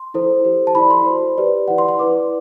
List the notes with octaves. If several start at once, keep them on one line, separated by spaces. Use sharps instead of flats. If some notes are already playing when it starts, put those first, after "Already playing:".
Already playing: C6
E4 A4 C5
G4 C5
A5
E4 A4 D5 B5
C6
F#4 C5
G4 B4 D5
E4 B4 D5 F#5
C6
C6
E4 B4 D5 D6